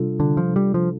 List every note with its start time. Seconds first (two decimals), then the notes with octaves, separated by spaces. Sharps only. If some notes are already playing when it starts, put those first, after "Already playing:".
Already playing: C3 G3 D4 F4 A4
0.20 D3
0.37 F3
0.56 G3
0.74 F3